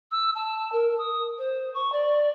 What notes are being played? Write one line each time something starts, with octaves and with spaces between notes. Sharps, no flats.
E6
A5
A#4
D#6
C5
C#6
D5